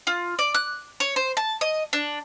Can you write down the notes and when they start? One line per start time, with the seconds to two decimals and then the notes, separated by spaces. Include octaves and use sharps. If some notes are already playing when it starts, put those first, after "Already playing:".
0.07 F4
0.39 D5
0.54 F#6
1.00 C#5
1.16 C5
1.37 A5
1.61 D#5
1.93 D4